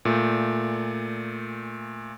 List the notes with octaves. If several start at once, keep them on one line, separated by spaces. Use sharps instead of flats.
A#2 A3